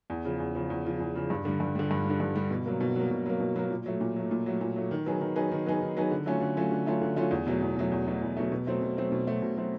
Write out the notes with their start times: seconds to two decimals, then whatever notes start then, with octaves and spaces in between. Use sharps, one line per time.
0.10 E2
0.25 C#3 F3
0.40 E2
0.55 C#3 F3
0.70 E2
0.85 C#3 F3
1.00 E2
1.15 C#3 F3
1.30 G2
1.45 D3 G3
1.60 G2
1.75 D3 G3
1.91 G2
2.05 G3
2.10 D3
2.20 G2
2.35 D3 G3
2.51 B2
2.66 F#3 A#3
2.81 B2
2.96 F#3 A#3
3.11 B2
3.26 F#3 A#3
3.40 B2
3.56 F#3 A#3
3.70 A#2
3.86 F#3 A3
4.01 A#2
4.16 F#3 A3
4.31 A#2
4.46 F#3 A3
4.61 A#2
4.76 F#3 A3
4.91 D#3
5.06 F#3 B3 D#4 G#4
5.21 D#3
5.36 F#3 B3 D#4 G#4
5.52 D#3
5.66 F#3 B3 D#4 G#4
5.81 D#3
5.97 F#3 B3 D#4 G#4
6.11 D3
6.26 F#3 A3 C#4 F4
6.41 D3
6.57 F#3 A3 C#4 F4
6.72 D3
6.86 F#3 A3 C#4 F4
7.02 D3
7.16 F#3 A3 C#4 F4
7.31 E2
7.47 B2 F#3 A3
7.62 E2
7.76 B2 F#3 A3
7.92 E2
8.06 B2 F#3 A3
8.21 E2
8.37 B2 F#3 A3
8.52 B2
8.67 F#3 A3 C4
8.82 B2
8.97 F#3 A3 C4
9.12 B2
9.27 F#3 A3 C4
9.42 B2
9.57 F#3 A3 C4